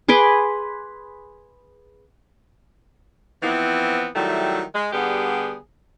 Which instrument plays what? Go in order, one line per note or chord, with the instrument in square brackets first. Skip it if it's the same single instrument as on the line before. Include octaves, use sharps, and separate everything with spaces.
[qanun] G#4 B4 C6 D6
[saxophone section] E3 F3 B3 C4 E4
D#3 F#3 G3 A3 E4
G#3
D3 G3 B3 G4 G#4